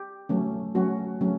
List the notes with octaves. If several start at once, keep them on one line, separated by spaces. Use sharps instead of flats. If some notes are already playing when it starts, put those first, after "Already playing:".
Already playing: G4
F#3 A3 C#4
F#3 A3 C#4 F#4
F#3 A3 C#4